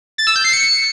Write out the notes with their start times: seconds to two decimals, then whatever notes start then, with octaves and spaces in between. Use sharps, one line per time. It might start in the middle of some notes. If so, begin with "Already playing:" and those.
0.18 A6
0.27 E6
0.36 G6
0.44 C7
0.53 C#7